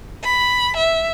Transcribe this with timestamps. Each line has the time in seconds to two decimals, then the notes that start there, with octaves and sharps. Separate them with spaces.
0.24 B5
0.77 E5